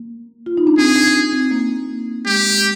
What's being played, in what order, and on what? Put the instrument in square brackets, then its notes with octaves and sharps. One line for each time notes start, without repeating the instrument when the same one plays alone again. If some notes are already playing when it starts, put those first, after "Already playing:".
Already playing: [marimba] A#3
F4
D#4
D4
[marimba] C4 [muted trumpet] G#4
[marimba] D4
D4
C4
A#3
[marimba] G#3 [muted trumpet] G4